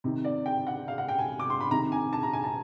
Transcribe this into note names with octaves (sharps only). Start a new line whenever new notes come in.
C3 D#3
D5
G5
F#5
F5
F#5
G5
G#5
D6
C6
B5
C3 D#3 A#5
G#5
A5
A#5
G#5
A5